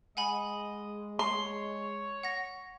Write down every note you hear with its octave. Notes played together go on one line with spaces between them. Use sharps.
G#3 D#5 F#5 G#5 B5
C#5 C6
F#5 A#6